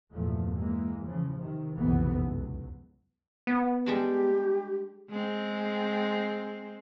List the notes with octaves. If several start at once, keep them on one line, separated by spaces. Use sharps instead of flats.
E2 G2 A#2 F3 A3
E3 G#3 A#3
C#3 E3 F3
C3 D#3
F#1 B1 F2 C3 E3 B3
C#2 F#3
B3
G3 G#3 D4 G4
G#3 C4